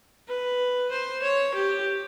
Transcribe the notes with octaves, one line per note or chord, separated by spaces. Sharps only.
B4
C5
C#5
G4